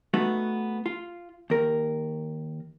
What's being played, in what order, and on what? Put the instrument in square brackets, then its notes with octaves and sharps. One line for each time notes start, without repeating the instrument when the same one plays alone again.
[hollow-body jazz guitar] A3 B3 D#4 F#4
F4
D#2 A#4